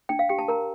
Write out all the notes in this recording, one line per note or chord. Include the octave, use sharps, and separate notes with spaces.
D4 G5
F5
G4 G5
A5
A#4 A#5